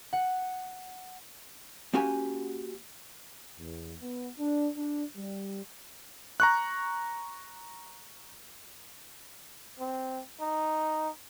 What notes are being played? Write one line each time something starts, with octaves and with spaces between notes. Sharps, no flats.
F#5
A#3 C#4 F#4 G4 G#5
E2
B3
D4
D4
G3
A#5 C#6 F#6
C4
D#4